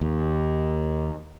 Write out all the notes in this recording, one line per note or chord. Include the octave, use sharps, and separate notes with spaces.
D#2